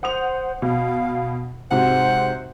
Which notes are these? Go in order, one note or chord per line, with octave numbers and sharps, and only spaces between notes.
C5 F#5 D#6 F7
B2 F5
G#2 C3 F#4 C5 F#5